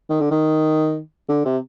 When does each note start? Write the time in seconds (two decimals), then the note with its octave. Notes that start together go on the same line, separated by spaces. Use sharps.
0.09 D#3
0.20 D3
0.31 D#3
1.29 D3
1.45 C3